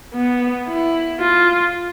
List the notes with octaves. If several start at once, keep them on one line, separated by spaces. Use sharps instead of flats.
B3
E4
F4